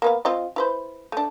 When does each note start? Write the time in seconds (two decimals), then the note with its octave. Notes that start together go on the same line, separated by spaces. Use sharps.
0.02 A#3 B3 F5
0.25 C4 F4 D#5
0.56 E4 B4 C5
1.12 A3 D4